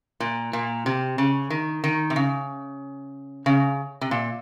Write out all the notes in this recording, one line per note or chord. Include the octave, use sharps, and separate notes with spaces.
A#2
A#2
C3
C#3
D#3
D#3
C3
C#3
C#3
C3
A#2